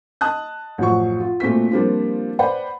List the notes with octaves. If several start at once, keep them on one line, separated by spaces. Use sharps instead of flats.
D#5 A5 D#6 F#6
A1 F#2 F3 C#6
F4
A#2 A3 C4 F#4 B6
F3 G3 A#3 C4 D4 F4
B4 C5 D5 F#5 G5 B5